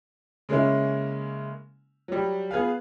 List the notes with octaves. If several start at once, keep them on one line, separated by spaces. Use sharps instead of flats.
C#3 G#3 A#3 C#4 E4
F#3 G3
B3 G#4 B4 F5